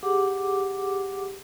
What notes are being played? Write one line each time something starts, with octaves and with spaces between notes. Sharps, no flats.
G4 G#4 F#5 D6